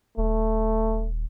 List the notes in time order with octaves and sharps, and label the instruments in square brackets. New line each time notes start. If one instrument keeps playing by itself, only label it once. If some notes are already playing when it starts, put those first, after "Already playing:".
[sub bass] D#1 [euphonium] A3